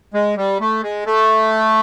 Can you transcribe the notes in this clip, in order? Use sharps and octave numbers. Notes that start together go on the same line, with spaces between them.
G#3
G3
A3
G#3
A3